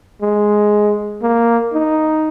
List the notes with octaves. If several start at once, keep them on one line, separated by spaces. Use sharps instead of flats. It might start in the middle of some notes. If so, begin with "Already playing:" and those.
G#3
A#3
D#4